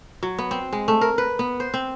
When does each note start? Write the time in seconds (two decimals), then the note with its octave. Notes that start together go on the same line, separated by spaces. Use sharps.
0.23 F#3
0.39 B3
0.51 C4
0.73 G#3
0.88 A3
1.01 A#4
1.18 B4
1.39 B3
1.60 C5
1.74 C4